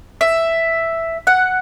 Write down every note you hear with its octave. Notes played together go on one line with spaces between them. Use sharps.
E5
F#5